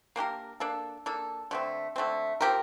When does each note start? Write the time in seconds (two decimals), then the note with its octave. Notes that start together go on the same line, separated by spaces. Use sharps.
0.16 A#3 D4 G4 A#4
0.60 A#3 D4 A4
1.06 A#3 D4 A4
1.51 D3 A3 C4
1.96 D3 A3 C4
2.41 F3 C4 G4 A#4